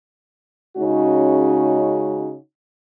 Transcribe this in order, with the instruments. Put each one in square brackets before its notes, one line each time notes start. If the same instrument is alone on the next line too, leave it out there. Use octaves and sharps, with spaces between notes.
[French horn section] C#3 G#3 C#4 D#4 F#4